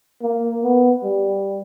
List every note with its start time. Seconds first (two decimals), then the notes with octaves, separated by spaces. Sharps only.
0.23 A#3
0.63 B3
1.04 G3